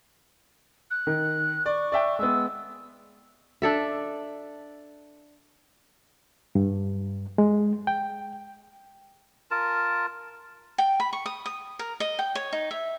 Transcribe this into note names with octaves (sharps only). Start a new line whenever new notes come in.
F#6
D#3
D5 C#6
D5 E5 G5
G#3 B3 E6
D4 A4 E5
G2
G#3
G5
F4 A#4 A5
G5
B5
C#6
D#6
D#6
A#4
D#5
G5
C#5
D#4
E5